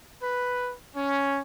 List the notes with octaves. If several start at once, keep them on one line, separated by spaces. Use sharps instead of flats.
B4
C#4